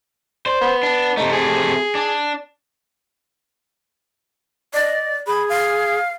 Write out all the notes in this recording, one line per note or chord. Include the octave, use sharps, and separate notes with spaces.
C5 D5
B3
D4
C3 A3 D#4
G#4
D4
D5 D#5
G#4 B5
F5